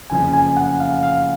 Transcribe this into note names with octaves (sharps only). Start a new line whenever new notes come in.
F#1 F2 C#3 F3 G#5
G#5
F#5
F5
F5